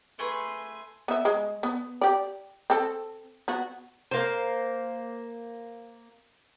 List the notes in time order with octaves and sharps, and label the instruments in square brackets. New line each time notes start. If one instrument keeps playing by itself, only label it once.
[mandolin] A3 G#4 B4 [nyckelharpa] G#5 C6
[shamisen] B3 E5
G#3
B3
G4 D5
C4 A4
B3 F#4
[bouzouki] A#3 C5